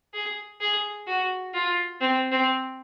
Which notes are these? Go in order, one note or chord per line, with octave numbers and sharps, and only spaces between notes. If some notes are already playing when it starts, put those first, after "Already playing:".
G#4
G#4
F#4
F4
C4
C4